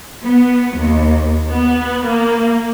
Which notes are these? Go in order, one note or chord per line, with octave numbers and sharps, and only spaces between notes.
B3
D#2
B3
A#3